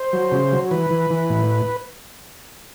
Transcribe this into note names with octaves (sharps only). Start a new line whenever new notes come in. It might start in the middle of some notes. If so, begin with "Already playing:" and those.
Already playing: C5
F#3
C#3
F#3
E3 B4
E3
E3
A2